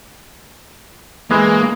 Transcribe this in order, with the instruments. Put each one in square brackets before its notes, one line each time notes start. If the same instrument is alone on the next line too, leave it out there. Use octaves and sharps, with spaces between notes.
[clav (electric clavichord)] E3 G#3 [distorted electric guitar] A#3